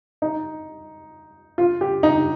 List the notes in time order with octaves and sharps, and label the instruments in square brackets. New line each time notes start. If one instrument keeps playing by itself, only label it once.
[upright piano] D#4
F4
G4
D#4